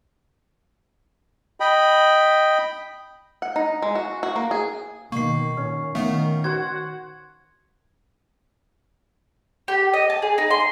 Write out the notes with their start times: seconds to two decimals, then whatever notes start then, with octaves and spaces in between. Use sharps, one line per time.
1.60 D#5 G5 B5
3.42 F#5
3.56 D#4
3.82 G#3
3.95 F#4
4.23 F#4
4.36 A#3
4.51 G#4
5.12 B2 D#3 A#3 C#6 C7
5.57 A#2 C#4
5.95 D#3 A3 B3 F5
6.44 F#4 C5 F#5 G#6
9.68 G4
9.94 D#5
10.10 A5
10.22 G#4
10.38 D#4
10.50 C6